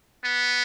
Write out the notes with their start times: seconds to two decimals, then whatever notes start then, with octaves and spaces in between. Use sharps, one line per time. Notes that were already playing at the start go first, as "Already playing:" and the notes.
0.24 B3